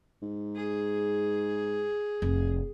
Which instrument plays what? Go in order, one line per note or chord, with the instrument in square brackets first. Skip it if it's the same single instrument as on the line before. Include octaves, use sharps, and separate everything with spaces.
[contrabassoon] G#2
[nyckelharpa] G#4
[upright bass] F1